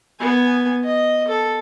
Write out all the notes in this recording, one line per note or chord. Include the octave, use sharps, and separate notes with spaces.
B3 G#5
D#5
A4